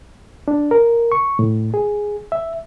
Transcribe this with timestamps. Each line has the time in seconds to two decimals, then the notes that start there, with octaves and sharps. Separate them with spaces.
0.48 D4
0.71 A#4
1.12 C#6
1.39 A2
1.74 G#4
2.32 E5